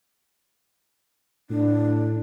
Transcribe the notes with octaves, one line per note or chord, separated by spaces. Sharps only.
A2 D4